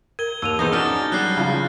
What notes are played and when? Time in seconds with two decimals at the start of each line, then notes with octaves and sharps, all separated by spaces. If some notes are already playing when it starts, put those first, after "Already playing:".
0.19 A#4 G#6 G7
0.42 D#2 E6 D#7 F7
0.59 E3 B3 D#4 G#4 C5 D#6 G6 A#6
0.73 C#4 D4 F#4 F6 A6
1.12 F#3 G3 D4 F#6 C7
1.37 C#3 F3